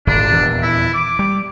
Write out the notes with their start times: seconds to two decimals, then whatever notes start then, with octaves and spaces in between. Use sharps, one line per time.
0.07 D#1 G#1 D3 D4
0.31 D#1 E2
0.62 E4
0.94 D6
1.19 G3